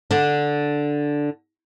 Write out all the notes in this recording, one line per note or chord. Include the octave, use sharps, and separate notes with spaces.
D3 D4